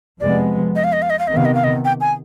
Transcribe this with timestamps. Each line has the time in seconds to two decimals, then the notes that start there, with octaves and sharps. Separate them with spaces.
0.20 F2 C3 F3 G#3 B3 D5
0.76 D#5
0.84 F5
0.93 D#5
1.02 F5
1.10 D#5
1.19 F5
1.27 C3 D#3 B3 D#5
1.37 F5
1.45 D#5
1.54 F5
1.64 D#5
1.85 G5
2.01 G#5